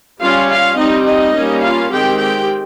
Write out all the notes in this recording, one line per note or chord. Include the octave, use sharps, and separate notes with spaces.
G3 C#4 F4 F5
F4 F5
G3 C4 D#4 D#5
D#4 D#5
G3 A#3 C#4
F4 F5
D#3 G#3 C4 G4 G5
G4 G5